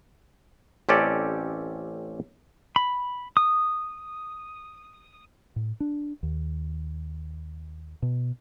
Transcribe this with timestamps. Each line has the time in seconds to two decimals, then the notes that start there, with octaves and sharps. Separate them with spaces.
0.89 A1 C4 C#4 G4 A4 D5
2.76 B5
3.37 D#6
5.56 A2
5.80 D4
6.23 D#2
8.02 B2